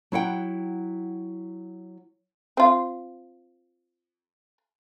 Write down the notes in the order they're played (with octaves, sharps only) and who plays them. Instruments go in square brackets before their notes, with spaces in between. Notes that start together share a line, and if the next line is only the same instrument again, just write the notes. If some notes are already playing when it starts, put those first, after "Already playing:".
[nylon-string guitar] F#3 E4 F#5 G5
[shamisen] C4 F4